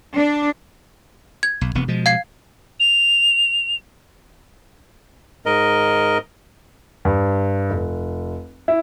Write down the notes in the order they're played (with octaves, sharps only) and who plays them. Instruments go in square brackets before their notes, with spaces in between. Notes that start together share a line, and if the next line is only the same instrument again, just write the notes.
[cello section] D4
[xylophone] G#6
[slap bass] B1
E1 C3 B3
B2 F3 G#3
[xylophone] F5 G#6 C7
[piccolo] F7
[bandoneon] G#2 A#4 D#5
[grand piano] G2
F1
E4